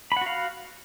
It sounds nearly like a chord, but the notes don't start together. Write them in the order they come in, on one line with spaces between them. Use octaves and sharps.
B5 F#5 F#4 F5